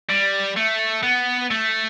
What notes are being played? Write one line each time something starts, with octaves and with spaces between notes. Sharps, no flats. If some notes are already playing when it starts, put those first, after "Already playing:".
G3
A3
B3
A3